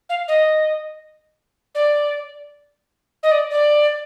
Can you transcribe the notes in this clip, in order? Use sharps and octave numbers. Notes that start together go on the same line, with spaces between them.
F5
D#5
D5
D#5
D5
D5